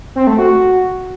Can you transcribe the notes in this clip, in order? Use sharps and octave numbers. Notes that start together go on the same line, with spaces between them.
C4
A3
F#4